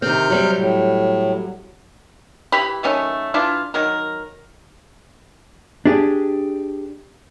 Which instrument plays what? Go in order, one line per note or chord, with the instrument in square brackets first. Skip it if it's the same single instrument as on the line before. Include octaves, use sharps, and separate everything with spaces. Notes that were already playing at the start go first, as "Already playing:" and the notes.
[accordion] C3 F6 G6 [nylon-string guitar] D#3 C4
[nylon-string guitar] F#3 G3 C4
[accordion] A2
[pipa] E3 G4 B5
D#3 F#3 A3 C#4
E3 D4 F4
D#3 F#3 A#4
[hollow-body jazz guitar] D4 G4 G#4